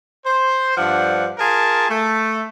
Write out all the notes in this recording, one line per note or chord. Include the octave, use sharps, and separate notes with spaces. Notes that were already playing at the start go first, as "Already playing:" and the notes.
C5
G2 F3 D4 F#5
F4 G#4 A#4 A5
A3